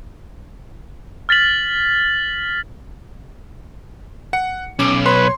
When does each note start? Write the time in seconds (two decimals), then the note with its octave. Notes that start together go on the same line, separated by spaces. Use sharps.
1.29 F6 A6 B6 F#7
4.33 F#5 C#7
4.79 B1 C#4 D6
5.06 B4 C#5 C6